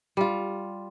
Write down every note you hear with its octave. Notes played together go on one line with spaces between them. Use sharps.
G3 F4